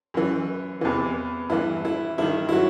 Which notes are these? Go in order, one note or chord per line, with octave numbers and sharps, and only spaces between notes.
F#2 E3
E2 C3 E3
G2 E3 E4
E4
G2 D#3 E4
E4
F#3 F#4